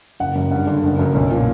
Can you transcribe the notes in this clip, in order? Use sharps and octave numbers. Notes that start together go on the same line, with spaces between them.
F#1 F#5
F#2
G2 F#5
D3
F#1
F#2
B1
A#2